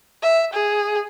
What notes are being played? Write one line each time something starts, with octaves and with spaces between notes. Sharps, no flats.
E5
G#4